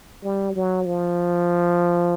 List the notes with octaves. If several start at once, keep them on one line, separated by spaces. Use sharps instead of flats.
G3
F#3
F3